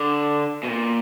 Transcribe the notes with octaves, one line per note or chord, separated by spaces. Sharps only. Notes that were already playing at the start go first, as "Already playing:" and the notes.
Already playing: D3
B2
A#2